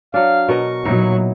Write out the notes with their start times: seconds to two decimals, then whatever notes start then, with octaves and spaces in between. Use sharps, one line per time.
0.14 F#3 D4 F5
0.49 B2 A#4 D#5 C#6
0.85 A#2 F#3 B3 D#4 E4